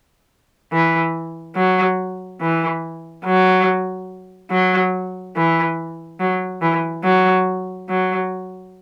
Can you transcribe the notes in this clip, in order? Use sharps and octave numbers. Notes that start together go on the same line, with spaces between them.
E3
F#3
E3
F#3
F#3
E3
F#3
E3
F#3
F#3